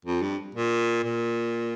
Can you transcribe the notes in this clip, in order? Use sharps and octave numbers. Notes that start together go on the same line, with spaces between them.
F2
G2
A#2
A#2